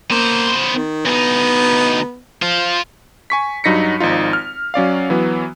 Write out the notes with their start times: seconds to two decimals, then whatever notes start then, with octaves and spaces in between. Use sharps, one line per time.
0.11 A#3 B3 C5
0.72 D#3
1.05 D2 B3 D#4
2.42 F4 C5
3.30 G#5 C#6 B6
3.64 G2 F#3 D#4 A#6 B6 C#7
4.00 G#1 F3 D#4 F4
4.33 F6
4.74 F#3 C#4 D5 F5
5.10 E3 F#3 B3